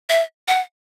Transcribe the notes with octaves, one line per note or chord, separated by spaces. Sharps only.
E5
F#5